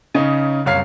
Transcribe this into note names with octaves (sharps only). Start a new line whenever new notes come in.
C#3 C#4 D#4
F#1 C2 C#5 F5 F6 C7